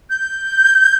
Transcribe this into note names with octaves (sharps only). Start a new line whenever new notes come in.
G6